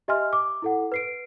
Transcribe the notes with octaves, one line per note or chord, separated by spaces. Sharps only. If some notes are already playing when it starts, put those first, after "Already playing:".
G4 D#5 E5 G#5 C6 F6
D6
E4 A4 F#5
B4 C7 D7